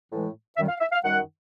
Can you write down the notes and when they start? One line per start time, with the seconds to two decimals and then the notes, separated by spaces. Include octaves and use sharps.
0.11 A2 E3 G#3
0.57 F#2 D#3 G3 E5
0.69 F5
0.81 E5
0.92 F5
1.04 F#2 D#3 G3 F#5